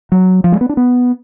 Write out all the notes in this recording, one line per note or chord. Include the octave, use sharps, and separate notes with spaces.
F#3
F3
G#3
B3
D4
B3